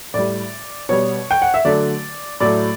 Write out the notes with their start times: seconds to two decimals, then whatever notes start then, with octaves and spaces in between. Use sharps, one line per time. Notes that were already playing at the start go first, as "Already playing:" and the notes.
0.14 A2 G3 D5
0.89 B2 G3 C#5
1.31 G5
1.42 F#5
1.54 E5
1.65 D3 F#3 A3 D5
2.40 A2 F#3 A3 D5